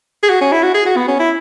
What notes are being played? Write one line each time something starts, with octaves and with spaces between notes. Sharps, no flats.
G#4
F#4
C#4
E4
F#4
G#4
F#4
B3
C#4
E4